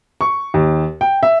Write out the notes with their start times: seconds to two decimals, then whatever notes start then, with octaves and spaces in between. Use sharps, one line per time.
0.21 C#6
0.54 D#2
1.01 G5
1.23 E5